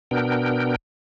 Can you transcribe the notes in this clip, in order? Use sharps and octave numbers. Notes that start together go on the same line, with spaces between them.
B2 B3 D4 A#4 G5